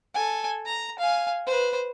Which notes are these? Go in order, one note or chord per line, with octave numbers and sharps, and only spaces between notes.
A4 G#5
A#5
F5 G#5
B4 C5